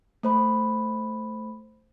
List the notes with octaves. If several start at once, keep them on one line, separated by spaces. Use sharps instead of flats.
A3 C5 B5